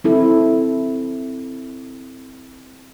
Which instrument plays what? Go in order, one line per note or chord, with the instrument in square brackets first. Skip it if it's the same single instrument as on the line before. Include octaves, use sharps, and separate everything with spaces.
[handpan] C4 E4 A4